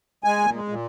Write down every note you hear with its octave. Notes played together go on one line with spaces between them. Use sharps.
G#3 G#5
A#2
G#3
A#2